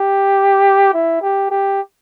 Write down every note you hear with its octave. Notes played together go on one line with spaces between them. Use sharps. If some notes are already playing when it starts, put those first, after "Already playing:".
Already playing: G4
E4
G4
G4